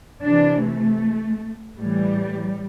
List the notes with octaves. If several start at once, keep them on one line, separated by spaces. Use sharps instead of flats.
C3 E3 D4
A3
A2 E3 G3